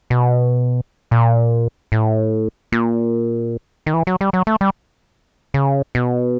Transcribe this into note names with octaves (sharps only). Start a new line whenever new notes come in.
B2
A#2
A2
A#2
D#3
E3
F#3
G3
F#3
A3
G3
C#3
B2